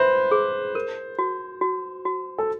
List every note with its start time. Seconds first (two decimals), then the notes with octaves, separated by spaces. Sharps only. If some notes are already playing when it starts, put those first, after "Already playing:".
Already playing: B4 C5 E5
0.31 G#4
0.75 A#4
1.19 F#4
1.61 F#4
2.05 F#4
2.38 A4